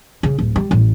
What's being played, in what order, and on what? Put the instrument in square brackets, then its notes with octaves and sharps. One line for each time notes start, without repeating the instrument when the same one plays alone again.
[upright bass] C#3
D1
G3
A1